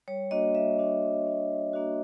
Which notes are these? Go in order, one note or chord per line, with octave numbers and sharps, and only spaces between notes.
G3 C#5
A#3 D4 F#4 D#5
G3 E5
A#3 D4 F#4
G3
A#3 D4 F#4
G3
A#3 D4 F#4